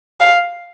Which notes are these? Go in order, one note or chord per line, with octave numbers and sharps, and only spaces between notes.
F5